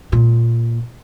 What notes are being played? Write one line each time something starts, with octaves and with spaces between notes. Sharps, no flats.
A#2